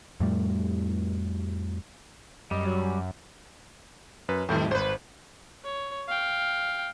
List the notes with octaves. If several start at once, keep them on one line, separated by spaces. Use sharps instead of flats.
F2 A2 G3
F#2 G3 D#5
F#3
F#2 B4
F2 A2 D#3 G3 A3
G#1 B4 C5
C#5
F5 G5